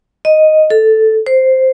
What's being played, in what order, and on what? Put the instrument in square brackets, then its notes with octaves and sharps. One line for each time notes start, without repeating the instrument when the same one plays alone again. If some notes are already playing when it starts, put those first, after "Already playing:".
[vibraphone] D#5
A4
C5